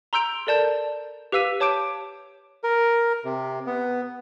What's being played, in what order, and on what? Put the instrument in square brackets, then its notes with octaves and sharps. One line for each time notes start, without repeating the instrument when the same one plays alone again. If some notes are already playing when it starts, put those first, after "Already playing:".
[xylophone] A#5 C6 E6 G6 D7 F7
A4 A#4 D5 A5 G6
G4 B4 F5 E6 B6 D#7
C#5 A5 D6 G6 D7
[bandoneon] A#4
C3
B3